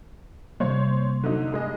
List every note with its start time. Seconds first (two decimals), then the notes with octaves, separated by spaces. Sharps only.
0.60 C3 G3 A#3 C5 C#5 C6
1.23 D3 F#3 D#4
1.52 G2 G#3 D#5